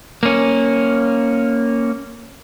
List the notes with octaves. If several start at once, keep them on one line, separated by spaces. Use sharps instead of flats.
A#3 C#4